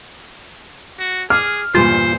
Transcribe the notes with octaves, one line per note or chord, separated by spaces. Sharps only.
F#4
G#4 D6 F6
E2 G2 A#2 F4 C5